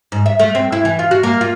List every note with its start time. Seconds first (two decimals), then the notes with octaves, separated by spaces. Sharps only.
0.12 G#2
0.26 E5
0.40 A3
0.55 C4
0.72 E4
0.85 E3
0.99 F4
1.11 F#4
1.23 A#3
1.41 F4